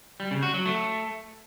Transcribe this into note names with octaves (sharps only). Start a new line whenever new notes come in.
G3
C#3
F#4
F#3
A3